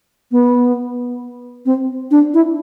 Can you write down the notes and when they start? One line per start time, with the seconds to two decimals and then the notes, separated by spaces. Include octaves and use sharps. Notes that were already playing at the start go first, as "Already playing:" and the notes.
0.32 B3
1.66 C4
2.11 D4
2.34 E4